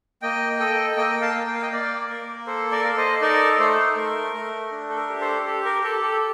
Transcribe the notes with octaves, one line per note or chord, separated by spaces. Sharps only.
A#3 D#5 G5
A4 D#5 G5
A#3 D#5 G5
F5 A5
A#3
G5
F5
D#5 G5
A#3 D5 F5
A#3 A#4
A4 C5
A#4 D5
A4 F5
C5 D#5
D#4 A#4 D5
A3 A4 C5
A3 A#4
A3
D4
A4
A#4
G4
A4 C5
G4 A4
A#4
G4 A4
A4